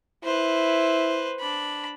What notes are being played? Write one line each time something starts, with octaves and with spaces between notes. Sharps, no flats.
E4 B4 C5
D4 B5